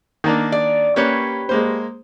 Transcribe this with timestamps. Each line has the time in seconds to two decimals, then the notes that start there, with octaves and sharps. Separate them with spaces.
0.24 D#3 A#3 D4
0.52 D5
0.96 A#3 C#4 G4 B4 C#5
1.49 G#3 A#3 C5